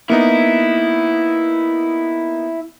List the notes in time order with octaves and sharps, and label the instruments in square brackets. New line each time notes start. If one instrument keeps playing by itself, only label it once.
[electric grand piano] A#3 B3 D#4 [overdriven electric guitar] E4